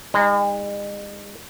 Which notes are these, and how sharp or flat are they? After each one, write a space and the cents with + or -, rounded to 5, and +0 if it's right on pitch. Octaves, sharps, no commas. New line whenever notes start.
G#3 -45 D#4 +0